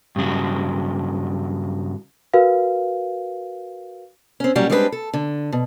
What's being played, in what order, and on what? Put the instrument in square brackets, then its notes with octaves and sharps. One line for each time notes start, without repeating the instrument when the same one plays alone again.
[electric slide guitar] G2 C#3 F#3
[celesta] F#4 A#4 B4 F5
[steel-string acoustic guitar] C4 C#4
A#2 F#3 G3 C#4 F#4
G3 G#3 C4 D4 F#4 B4
A4
D3
B2